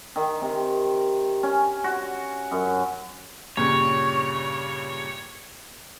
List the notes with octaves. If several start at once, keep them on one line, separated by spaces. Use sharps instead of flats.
D#3
C3
C#4
F#4
F#2
G2 A#2 C#3 C#5